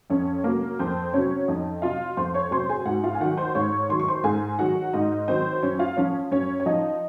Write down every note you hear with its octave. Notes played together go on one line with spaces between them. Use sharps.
F2 C#4 C#5
C3 F#3 A#3 A#4
F2 C4 C5
C3 F#3 C#4 C#5
F2 D#4 D#5
C3 F#3 F4 F5
F2 C5 C6
C#5 C#6
C3 F#3 C5 C6
G#4 G#5
G#2 F#4 F#5
F4 F5
G#5
D#3 F#3 F#4 F#5
C5 C6
G#2 C#5 C#6
D#3 F#3 C6
C#6
C5 C6
G#2 G#4 G#5
D#3 F#3 F#4 F#5
G#2 D#4 D#5
D#3 F#3 C4 C5
F#2 C#4 C#5
F4 F5
F3 C#4 C#5
F#2 C#4 C#5
C#5
F3 D#4 D#5